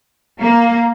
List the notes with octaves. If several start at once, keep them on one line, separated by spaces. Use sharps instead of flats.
A#3